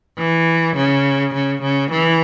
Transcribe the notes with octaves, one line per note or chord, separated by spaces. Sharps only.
E3
C#3
C#3
C#3
E3